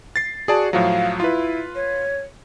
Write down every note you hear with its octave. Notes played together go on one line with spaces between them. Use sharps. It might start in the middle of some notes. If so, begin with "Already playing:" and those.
A6 C7
F#4 G#4 D5 A5
A2 F3 F#3 F5
E4 F4 B4
C#5